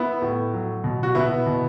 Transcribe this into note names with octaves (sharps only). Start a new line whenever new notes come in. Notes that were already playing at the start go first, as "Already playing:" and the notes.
Already playing: B3 E4
A2
F#3
B2
F#4
B2 B3 E4
B2